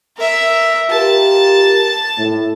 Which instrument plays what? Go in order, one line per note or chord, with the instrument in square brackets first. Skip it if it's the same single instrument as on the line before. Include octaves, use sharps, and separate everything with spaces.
[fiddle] A#4 E5
[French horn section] F4 G4 A#4 [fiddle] A5
[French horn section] A2